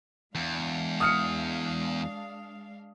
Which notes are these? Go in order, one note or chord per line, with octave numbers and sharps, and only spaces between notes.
E2 G#3 D4 F5
D#6 F6 C#7